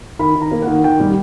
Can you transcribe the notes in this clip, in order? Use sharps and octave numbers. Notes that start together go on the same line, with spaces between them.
D#3 B5
D#3
A#5
A#3
F#5
D#3
D#3 G5
G3